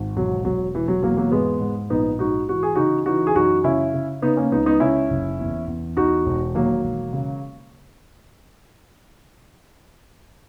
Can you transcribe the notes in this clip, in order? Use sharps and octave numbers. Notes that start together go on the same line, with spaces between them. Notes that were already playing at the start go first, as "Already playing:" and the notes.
Already playing: G#1
E1 F#3
E1 F#3
E1 E3
F#3
E2 F#3 A#3
F#3 A#3
G#2 G#3 B3
G#2
A#1 B3 D#4
G#2 D#4 F#4
E3 F#4
G#4
C#3 D#4 F#4
E3 D#4 F#4
G#4
F#2 D#4 F#4
C#3 C#4 E4
C#3
C#3 B3 D#4
A#3 C#4
C#2 B3 D#4
B3 D#4
C#3 C#4 E4
F#1
E2
E2
E2 D#4 F#4
E1
D#3 F#3 A#3
E1
C#3